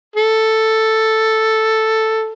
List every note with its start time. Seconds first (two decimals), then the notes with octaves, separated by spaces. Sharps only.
0.16 A4